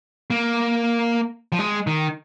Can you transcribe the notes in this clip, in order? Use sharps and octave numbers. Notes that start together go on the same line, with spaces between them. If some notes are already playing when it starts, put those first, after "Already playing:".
A#3
F3
G#3
D#3